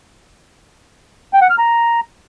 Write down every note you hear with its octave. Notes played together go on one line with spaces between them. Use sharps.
G5
F#5
F6
A#5